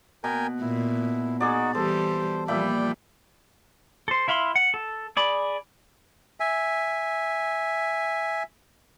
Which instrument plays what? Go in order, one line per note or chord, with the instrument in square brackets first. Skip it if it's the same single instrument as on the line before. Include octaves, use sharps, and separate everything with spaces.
[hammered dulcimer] B2 [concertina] A#4 G5 G#5
[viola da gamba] A#2 [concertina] E4
[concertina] D#4 F#4 [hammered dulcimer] G#4 D5
[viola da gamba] E3 G3 G4 [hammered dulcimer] A4 [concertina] C5
[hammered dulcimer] A#2 E5 B5 [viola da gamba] F3 G3 [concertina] D5 G5
[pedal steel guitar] A4 C5
E4 E5 F5 B5 C6
F#5
A4
G#4 D5 B5
[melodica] E5 G#5